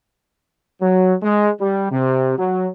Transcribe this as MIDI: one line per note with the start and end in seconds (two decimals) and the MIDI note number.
0.82 1.15 54
1.23 1.50 56
1.61 1.89 55
1.92 2.35 48
2.39 2.68 54